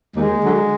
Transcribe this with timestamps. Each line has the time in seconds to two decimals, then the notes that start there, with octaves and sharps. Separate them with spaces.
0.16 D#2 G#3
0.43 D3 F#3